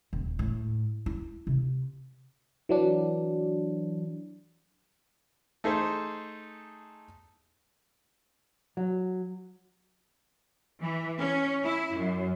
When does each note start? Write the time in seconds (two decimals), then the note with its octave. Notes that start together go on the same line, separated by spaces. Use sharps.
0.13 D#1
0.39 A2
1.06 E4
1.47 C3
2.69 E3 F#3 D4
5.64 A3 D#4 G#4 A4 C5
8.77 F#3
10.82 E3
11.18 C#4
11.64 E4
11.97 F#2